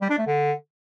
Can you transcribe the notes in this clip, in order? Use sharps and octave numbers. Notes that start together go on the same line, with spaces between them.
G3
D4
A3
D3